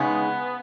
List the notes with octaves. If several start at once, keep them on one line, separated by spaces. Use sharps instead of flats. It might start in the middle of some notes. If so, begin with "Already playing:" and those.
Already playing: C#3 G#3 B3 D#4 B4